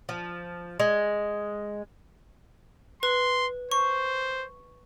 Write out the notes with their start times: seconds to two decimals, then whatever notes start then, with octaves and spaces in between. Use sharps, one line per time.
0.09 F3
0.80 G#3
3.03 B4 C6
3.72 C5 C#6